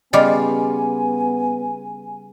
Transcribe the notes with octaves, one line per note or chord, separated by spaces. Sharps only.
C#3 G3 B3 F4 D5 D#5 G#5 D6